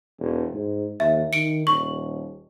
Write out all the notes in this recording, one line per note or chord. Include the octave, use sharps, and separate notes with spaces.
E1
G#2
D#2 E5
D#3 C#7 D7
D#1 C#6